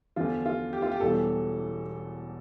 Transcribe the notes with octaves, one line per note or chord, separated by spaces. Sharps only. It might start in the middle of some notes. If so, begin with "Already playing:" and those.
E2 D3 F3 F4
F4
G4
F4
G4
E1 E2 E3 G3 A4